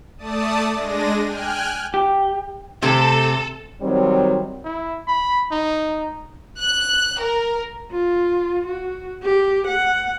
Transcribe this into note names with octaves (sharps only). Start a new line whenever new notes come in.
A3 D5 A5 D#6
G#3 D4 A#6 D#7
G5 G#5 F6 F#6
G4
C3 A3 C4 A4
D#3 F#3 G3 C4
E4
B5
D#4
F#6
A#4
F4
F#4
G4
F#5